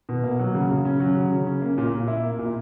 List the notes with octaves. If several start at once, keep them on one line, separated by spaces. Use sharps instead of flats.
B2
A#3
F#3
C#3
C#3
C#4
F#3
C#3
C#3
C#4
A#3
A#2
A#2
E4
A#3
A#2